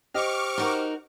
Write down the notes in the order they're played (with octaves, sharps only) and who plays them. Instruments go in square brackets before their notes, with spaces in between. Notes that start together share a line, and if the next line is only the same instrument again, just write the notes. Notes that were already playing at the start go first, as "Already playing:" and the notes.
[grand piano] G4 D#5 [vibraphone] C5 [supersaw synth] C#6 D6 F6
[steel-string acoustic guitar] D#4 F#4 A#4